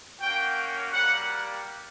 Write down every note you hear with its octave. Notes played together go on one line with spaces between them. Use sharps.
A#3 C#4 F#4 G5
G3 A#3 F#5